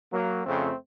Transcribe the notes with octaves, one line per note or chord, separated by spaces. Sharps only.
F#3 A#3
F2 C#3 A3 C4